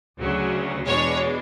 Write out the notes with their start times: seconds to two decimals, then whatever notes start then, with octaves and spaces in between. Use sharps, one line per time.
0.18 D2 C#3 F#3
0.85 E2 B2 G#3 D4 C#5